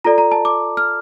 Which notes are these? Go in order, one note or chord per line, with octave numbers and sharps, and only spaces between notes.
F4 A4 D5 A#5
A#5
A5
D6
F6